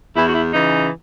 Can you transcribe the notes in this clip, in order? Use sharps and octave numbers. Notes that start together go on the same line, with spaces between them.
E2 E4
F#4
E4
C#3 E3 D#4